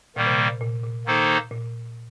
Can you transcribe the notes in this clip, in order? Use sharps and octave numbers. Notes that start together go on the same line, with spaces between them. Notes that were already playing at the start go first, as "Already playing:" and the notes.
A#2 D#3 G3 A#3
C3
A#2
A#2
A#2
D#3 A#3 D#4 A4 C5
A#2